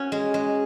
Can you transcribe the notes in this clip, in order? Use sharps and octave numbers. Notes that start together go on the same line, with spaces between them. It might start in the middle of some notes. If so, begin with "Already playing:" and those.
Already playing: C#4 F#4
G#3
G#3